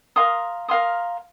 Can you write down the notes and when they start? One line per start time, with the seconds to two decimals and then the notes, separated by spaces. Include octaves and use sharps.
0.16 A#4 F5 C6 D#6
0.68 A#4 F5 C6 D#6